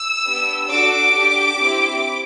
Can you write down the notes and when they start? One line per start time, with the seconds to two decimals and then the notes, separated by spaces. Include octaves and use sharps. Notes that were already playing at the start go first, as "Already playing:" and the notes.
Already playing: E6
0.24 B3 D4 G4
0.69 D4 F#4 A4 D6
1.14 D4 G4
1.60 C4 E4 G4